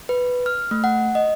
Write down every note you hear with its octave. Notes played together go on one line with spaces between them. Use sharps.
B4
F6
A3
F#5
D#5